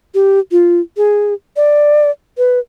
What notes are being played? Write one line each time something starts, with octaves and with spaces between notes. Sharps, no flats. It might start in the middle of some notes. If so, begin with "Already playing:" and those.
G4
F4
G#4
D5
B4